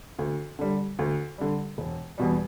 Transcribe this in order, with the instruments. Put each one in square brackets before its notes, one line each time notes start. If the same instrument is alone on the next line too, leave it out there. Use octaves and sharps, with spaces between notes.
[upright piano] D2
D3 G3
D2
D3 G3
E1
E2 B2 G3